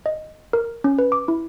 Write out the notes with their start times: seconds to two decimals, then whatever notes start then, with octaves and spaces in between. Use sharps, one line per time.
0.06 D#5
0.53 A#4
0.84 C#4
0.99 B4
1.12 D6
1.28 E4